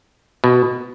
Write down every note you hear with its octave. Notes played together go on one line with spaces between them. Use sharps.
B2